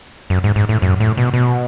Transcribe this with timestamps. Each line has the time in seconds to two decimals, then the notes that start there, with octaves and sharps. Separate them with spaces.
0.30 F#2
0.44 G#2
0.56 G#2
0.69 A2
0.82 F#2
1.00 A2
1.17 B2
1.34 B2